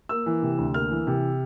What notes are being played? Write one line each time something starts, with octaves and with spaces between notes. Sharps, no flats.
A#3 E6
E3
C3
D2
A#3 F6
E3
C3